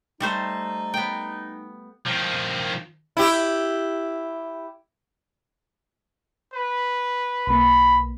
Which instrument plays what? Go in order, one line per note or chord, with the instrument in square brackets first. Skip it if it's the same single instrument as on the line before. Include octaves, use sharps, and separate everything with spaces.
[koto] G3 A3 C5 [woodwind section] D#4
[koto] B3 G5
[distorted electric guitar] D#3 F3
[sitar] E4 G4
[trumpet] B4
[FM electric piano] B1 A#3 [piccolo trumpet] B5